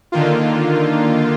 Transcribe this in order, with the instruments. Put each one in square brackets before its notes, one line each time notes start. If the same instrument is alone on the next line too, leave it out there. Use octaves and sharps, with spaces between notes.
[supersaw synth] D3 D#3 A#3 F4